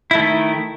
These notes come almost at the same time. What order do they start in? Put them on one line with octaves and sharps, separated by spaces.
E4 A3 D#3